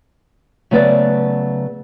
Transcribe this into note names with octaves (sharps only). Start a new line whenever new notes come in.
C#3 F#3 A3 B3 B4 D5